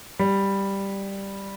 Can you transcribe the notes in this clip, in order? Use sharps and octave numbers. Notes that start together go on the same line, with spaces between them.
G3